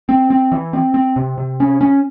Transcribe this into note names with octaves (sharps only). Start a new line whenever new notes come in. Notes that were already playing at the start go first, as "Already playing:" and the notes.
C4
C4
E3
C4
C4
C3
C3
C#4
C#4